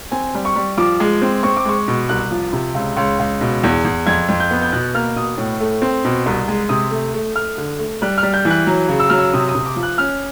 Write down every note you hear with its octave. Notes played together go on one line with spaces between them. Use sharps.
C4 G#5
G3
C#6
G3
F3 D6
G#3
C4
C4 C#6
D6
G#3 C#6
B2
C2 F#6
F3
C3
C#2
C#2
C#2
B2
E2
E2
F2 G#6
F2
G6
B3
G6
B2 F#6
A#3 F6
B2 D#6
A2
A3
C4
B2
C2
G#3
C3 D#6
A3
A3
A3 F6
D3
A3
G3 F#6
F6
G3
G6
E3
F#6
F#3
C#3
E6
F#3 F6
E6
C3 D#6
D#6
C3
D6
F3
F#6
C#4 F6